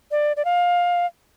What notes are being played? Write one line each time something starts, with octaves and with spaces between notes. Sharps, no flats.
D5
D5
F5